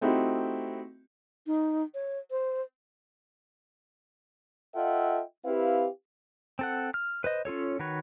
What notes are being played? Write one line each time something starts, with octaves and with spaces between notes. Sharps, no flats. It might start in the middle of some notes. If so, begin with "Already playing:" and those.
A3 C4 D#4 E4 F#4 G4
D#4
C#5
C5
F4 A4 D#5 E5 F#5 G5
C4 E4 G4 B4 F5
C4 A4 F#5
F6
B4 C5 D#5
C#4 F4 A4 C#5
D#3 F#4 B4 C#5